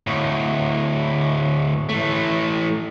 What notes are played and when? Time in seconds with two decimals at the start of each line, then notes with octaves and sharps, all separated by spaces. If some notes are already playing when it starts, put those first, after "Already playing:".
0.07 D2 A2
1.89 E3 A3